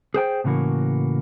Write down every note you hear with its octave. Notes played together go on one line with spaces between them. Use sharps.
G#4 C5 G5
A2 C#3 E3 A#3 F#4